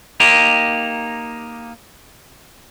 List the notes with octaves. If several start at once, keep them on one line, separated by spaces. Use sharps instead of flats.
A#3 D#4 G4